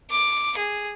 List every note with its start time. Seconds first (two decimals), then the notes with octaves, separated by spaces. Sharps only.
0.11 D6
0.57 G#4